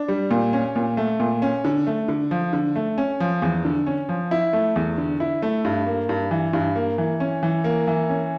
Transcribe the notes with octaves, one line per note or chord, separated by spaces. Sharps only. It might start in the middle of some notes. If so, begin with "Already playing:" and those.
Already playing: D4
G3
A#2
C#4
A#2
A3
A#2
C#4
D3
A3
D3
F3
D3
A3
C#4
F3
E2
D3
C#4
F3
E4
A3
E2
D3
E4
A3
G2
A#3
G2
E3
G2
A#3
E3
C#4
E3
A#3
E3
C#4